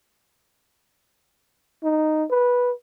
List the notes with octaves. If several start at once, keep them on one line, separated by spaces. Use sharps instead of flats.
D#4
B4